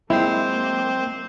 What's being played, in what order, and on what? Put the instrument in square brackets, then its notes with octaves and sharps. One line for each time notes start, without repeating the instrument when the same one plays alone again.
[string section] F#3 A#3 [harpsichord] G#3 G4 [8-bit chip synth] C4 C5 [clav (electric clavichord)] E4